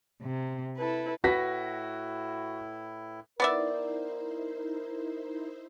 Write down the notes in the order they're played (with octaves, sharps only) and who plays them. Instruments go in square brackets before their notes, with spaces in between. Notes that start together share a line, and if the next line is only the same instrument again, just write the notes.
[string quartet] C3
E4 A4 B4
[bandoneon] A2 E4 [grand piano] F#4 [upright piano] B4 A#6 B6
[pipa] B3 D5 E5 [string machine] D#4 E4 C5 [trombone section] A#4